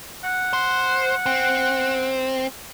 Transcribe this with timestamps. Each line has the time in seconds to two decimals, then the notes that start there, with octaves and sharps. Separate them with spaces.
0.24 F#5
0.53 C5
1.26 C4